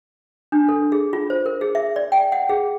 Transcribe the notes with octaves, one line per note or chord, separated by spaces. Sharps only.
D4
A4
G#4
F4
C5
A#4
G#4
E5
D5
G5
F#5
G#4